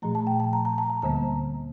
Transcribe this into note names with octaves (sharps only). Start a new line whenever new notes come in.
A#2 F3 A3 A#5
A5
G5
A5
A#5
A#5
A5
A5
D2 D3 G3 A#3 A#5